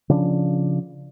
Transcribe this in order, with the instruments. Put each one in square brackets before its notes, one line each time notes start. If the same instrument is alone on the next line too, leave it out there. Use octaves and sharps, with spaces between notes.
[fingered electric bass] C#3 F3 D4